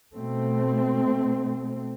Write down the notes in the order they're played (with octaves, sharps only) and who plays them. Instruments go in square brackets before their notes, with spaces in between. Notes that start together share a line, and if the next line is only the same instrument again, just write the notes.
[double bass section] B2 A3 C4